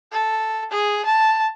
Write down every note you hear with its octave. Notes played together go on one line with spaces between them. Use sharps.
A4
G#4
A5